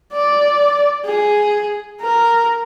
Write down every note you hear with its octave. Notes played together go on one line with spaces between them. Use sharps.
D5
G#4
A#4